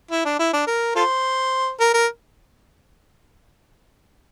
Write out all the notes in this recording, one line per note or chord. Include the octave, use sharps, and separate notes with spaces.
E4
D4
E4
D4
A#4
F4 A4 C5
A#4
A#4